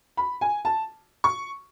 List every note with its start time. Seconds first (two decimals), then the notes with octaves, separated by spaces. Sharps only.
0.17 B5
0.41 G#5
0.65 A5
1.24 C#6